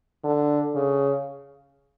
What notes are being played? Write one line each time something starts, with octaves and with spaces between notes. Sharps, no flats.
D3
C#3